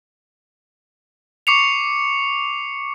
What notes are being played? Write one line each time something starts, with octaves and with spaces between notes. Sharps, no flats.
C#6 D6 C7 C#7 F7